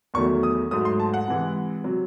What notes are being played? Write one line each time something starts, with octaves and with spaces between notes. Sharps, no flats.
E2 D#3 F#3 A3 C#6
D#6
G#2 F#3 A3 D#6
C6
A5
F#5
C3 E3 G#3
C3 F#3